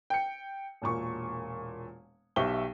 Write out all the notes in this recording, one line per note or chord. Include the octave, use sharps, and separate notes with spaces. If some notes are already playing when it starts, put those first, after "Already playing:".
G5 C#7
E1 A#2 C#6
B1 G4 E5 G5 C#6 G7